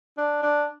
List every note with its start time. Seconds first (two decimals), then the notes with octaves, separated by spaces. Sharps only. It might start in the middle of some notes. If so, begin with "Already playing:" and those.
0.17 D4
0.43 D4